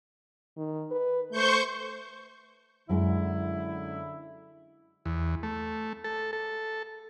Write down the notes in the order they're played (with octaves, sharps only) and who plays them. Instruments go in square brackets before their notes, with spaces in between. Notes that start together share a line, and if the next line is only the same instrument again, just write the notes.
[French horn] D#3
B4
[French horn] A3 [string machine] C5 C#6 G6
[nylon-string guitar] F#2 G#3 [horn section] D3 E4
[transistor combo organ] E2
A3
A4
A4